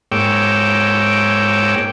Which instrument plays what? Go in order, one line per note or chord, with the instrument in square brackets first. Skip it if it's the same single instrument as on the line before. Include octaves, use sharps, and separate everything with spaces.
[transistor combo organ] G#2 A#3 C#5 G5 D6 E6